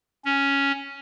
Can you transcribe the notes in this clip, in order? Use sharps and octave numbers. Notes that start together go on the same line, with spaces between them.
C#4